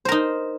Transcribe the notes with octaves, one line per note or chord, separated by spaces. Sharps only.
D#4 A#4 C5